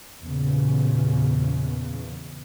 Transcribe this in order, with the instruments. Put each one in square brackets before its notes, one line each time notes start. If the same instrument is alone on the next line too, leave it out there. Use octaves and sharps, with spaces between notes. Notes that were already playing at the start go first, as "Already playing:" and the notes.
[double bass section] E2 A#2 C#3